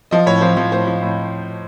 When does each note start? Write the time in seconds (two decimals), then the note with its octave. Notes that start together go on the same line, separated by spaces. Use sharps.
0.11 F3 D#5
0.26 A2 C#5
0.41 F3 C5
0.57 F3
0.72 A2 C5
0.87 F3
1.02 A2